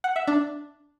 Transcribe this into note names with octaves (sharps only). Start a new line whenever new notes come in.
F#5
E5
D4